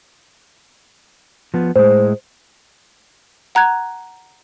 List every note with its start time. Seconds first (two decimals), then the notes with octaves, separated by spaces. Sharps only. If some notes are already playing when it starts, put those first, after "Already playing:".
1.54 F3 B3
1.76 A2 G#3 C5
3.55 F#5 A#5 F#6 G#6